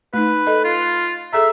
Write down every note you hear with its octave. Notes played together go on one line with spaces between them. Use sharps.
A3 D#4 B4
A4 D#5
F4
G#4 A4 E5 A#5